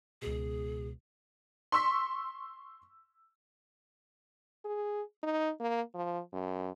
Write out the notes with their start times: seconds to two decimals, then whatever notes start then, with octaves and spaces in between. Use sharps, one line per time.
0.22 C#2 B2 G#4
1.72 C6 C#6 E6 B6
4.65 G#4
5.23 D#4
5.60 A#3
5.95 F3
6.33 F#2